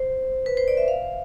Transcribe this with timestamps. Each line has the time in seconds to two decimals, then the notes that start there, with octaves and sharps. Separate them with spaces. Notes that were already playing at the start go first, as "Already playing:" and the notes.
Already playing: C5
0.46 B4
0.57 C5
0.68 D5
0.77 E5
0.88 F5